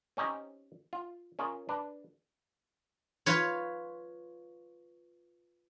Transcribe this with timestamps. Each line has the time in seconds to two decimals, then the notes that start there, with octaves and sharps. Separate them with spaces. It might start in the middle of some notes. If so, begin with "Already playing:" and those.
0.17 C4 C#4 D#4 G4
0.93 F4
1.39 C#4 F4 G#4 A#4
1.69 D4 B4
3.26 F4 B4 C#5